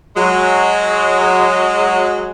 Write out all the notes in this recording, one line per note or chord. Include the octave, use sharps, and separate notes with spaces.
F#3 G#3